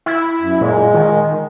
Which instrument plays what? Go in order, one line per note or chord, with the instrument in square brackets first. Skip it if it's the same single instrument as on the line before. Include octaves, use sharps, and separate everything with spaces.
[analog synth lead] E4
[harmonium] F#2
[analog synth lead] A#2 [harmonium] G#3
[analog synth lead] D#3